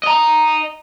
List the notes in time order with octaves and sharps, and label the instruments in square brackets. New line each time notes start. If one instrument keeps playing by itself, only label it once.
[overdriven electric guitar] D#5 A#5